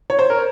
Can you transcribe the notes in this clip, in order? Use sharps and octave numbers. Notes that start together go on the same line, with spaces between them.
C#5
C5
A#4